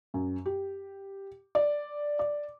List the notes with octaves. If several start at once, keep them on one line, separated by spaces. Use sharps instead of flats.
F#2
G4
D5
D5